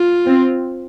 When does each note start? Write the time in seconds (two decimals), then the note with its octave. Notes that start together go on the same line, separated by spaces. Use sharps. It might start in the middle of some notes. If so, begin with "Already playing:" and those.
Already playing: F4
0.25 C4